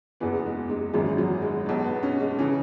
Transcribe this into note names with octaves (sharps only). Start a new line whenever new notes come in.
F#1 E2 E3 B3
G#3
G#3
G#1 F#2 E3 G#3
F#3
G#3
B1 B2 G#3
B3
C#4
G#3
C#3 E3 C#4